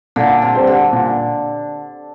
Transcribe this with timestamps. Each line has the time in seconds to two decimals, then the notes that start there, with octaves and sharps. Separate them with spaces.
0.16 A#2 D3
0.42 C3
0.55 G3 C4 G4 C5
0.67 D3
0.93 A#2